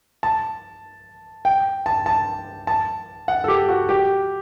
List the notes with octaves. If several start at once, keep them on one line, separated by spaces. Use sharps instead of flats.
A5
G5
A5
A5
A5
F#5
A4
G4
F#4
G4